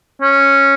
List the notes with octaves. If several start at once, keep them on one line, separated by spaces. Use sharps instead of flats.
C#4